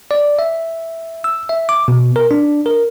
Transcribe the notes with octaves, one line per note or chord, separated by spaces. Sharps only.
D5
E5
E6
E5
D6
B2
A#4
D4
A#4